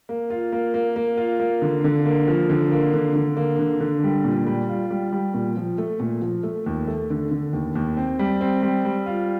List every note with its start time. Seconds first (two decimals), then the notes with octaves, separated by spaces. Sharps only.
0.09 A#3
0.30 F4
0.52 A#3
0.74 A#3
0.96 A#3
1.17 F4
1.40 A#3
1.62 D3
1.84 D3
2.06 A#3
2.28 F3
2.50 D3
2.72 A#3
2.94 D3
3.16 D3
3.37 A#3
3.59 D3
3.80 D3
4.03 G3
4.25 A#2
4.47 G3
4.69 F4
4.91 G3
5.12 G3
5.34 A#2
5.57 F3
5.78 A3
6.00 A#2
6.22 F3
6.43 A3
6.66 D#2
6.87 A3
7.10 D3
7.31 D3
7.53 D#2
7.76 D#2
7.97 C4
8.19 G3
8.41 C4
8.63 G3
8.85 G3
9.06 F4